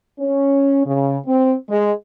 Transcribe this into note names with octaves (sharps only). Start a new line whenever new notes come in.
C#4
C#3
C4
G#3